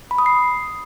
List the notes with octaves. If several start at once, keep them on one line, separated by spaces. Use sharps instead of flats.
B5
D#6
C7